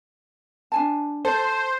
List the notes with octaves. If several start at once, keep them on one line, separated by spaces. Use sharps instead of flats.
D4 G#5 A5
A4 C5